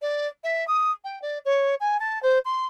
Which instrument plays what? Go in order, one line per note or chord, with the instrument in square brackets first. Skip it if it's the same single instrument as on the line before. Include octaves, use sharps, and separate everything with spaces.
[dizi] D5
E5
D#6
G5
D5
C#5
G#5
A5
C5
C6